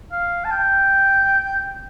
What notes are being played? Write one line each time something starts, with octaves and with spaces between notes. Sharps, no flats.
F5
A5
G5